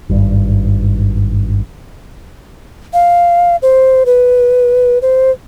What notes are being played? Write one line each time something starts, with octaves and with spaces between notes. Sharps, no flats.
G#1 G2
F5
C5
B4
C5